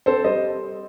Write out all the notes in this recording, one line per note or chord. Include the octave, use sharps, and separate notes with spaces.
C4 A4 C5
G3 C5 D#5